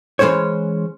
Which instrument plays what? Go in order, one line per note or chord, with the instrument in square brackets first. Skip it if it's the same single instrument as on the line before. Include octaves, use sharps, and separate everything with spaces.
[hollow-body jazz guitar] E3 G#3 A#3 C#4 C5 C#5